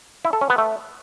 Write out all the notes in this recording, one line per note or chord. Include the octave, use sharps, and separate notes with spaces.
E4
A4
C#4
B3
A3